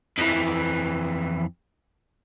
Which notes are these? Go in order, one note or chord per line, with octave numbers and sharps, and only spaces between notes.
F2 E3